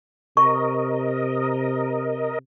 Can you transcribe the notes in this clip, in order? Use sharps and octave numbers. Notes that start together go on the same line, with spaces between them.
C3 A#4 D#5 C#6